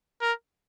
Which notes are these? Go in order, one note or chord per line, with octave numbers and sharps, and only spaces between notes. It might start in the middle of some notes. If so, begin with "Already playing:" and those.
A#4